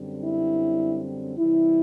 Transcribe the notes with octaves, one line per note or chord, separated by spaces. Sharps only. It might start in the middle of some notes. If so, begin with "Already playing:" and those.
Already playing: F#2 D3 G3 C4
E4
C3 E3 G3 E4